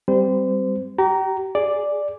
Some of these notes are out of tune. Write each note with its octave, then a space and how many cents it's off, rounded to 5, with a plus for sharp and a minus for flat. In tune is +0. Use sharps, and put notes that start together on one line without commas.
G3 +0 C4 +0 C5 -30
G4 -40 A#5 +0
G#4 +0 D5 +0